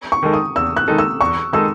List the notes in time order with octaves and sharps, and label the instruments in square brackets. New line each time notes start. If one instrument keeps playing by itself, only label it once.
[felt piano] C#6
[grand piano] D#3 G#3 D#4 A4
[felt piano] D#6
[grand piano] E2 [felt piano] E6
[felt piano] F#6
[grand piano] D#3 G#3 D#4 A4
[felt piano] E6
[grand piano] E2 [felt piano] C#6
[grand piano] D#3 G#3 D#4 A4 [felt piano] E6